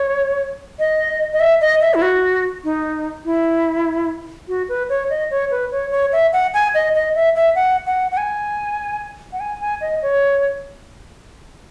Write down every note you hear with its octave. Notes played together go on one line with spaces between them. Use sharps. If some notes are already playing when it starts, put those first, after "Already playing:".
Already playing: C#5
D#5
D#5
E5
D#5
E5
E4
F#4
D#4
E4
F#4
B4
C#5
D#5
C#5
B4
C#5
C#5
E5
F#5
G#5
D#5
D#5
E5
E5
F#5
F#5
F#5
G#5
F#5
G#5
G#5
D#5
C#5